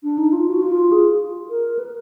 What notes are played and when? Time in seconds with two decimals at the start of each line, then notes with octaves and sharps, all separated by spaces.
0.03 D4
0.18 D#4
0.32 F4
0.48 F#4
0.62 F4
0.92 G#4
1.50 A#4
1.79 B4